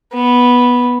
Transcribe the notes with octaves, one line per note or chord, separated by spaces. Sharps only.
B3